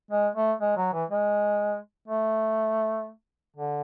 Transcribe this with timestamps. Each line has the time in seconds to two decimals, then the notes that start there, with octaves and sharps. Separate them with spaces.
0.11 G#3
0.36 A3
0.61 G#3
0.77 F#3
0.93 E3
1.10 G#3
2.08 A3
3.56 D3